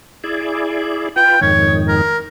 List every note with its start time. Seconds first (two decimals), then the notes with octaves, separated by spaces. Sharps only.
0.24 E4 G#4 D5
1.16 F4 B4 G5
1.41 F2 G#2 D#3 C#5
1.88 A#4